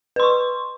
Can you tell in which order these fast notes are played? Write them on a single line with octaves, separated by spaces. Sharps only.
B4 C6 C#6